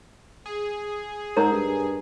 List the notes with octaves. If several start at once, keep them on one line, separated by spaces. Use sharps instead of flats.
G#4
G#2 A#4 C#5 A#5
G2